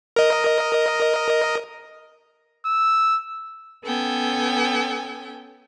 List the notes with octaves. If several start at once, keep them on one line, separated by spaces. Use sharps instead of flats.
A#4 D#5
E6
B3 C#4 A4 G5 G#5